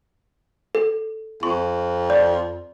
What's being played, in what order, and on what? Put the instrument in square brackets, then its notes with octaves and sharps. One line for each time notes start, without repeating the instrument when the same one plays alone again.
[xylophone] A4
[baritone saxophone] F2 [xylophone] C#6
[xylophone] D5